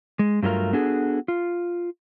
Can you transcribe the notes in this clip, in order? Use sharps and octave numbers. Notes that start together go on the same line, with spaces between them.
G#3
G2 F#3 A3 F4 A#4
B3 D4 F#4 G#4 A4
F4